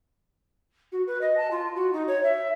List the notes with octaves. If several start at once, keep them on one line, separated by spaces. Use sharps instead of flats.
F#4
B4
D#5
A5
F4
F#4
D#4
C#5
E5